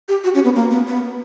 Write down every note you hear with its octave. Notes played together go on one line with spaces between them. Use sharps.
G4
F#4
C#4
B3
A#3
B3
B3